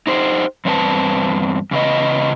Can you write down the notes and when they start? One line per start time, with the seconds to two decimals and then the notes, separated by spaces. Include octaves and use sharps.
0.07 D#4 G4 C5
0.65 E2 G2 C4 D#4 B4 A5
1.71 E2 C#3 B4 D#5